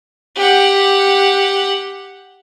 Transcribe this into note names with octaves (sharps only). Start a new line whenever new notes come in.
G4 F#5